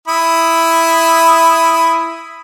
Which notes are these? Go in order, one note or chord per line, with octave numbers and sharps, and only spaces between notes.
E4 B5 D#6